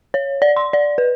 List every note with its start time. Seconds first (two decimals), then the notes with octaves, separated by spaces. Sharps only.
0.14 C#5
0.42 D5
0.56 C6
0.73 D5
0.98 B4